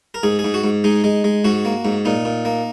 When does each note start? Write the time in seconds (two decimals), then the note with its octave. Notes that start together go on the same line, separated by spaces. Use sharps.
0.14 A#4
0.23 G#2 G#4
0.39 G#4
0.44 G#2
0.54 F#4
0.64 G#2
0.84 G#3 D#4
1.04 G#3
1.24 G#3
1.44 G#2 F#4
1.65 A#3
1.85 G#2
2.05 A#2 D#4
2.25 A#2
2.45 A#3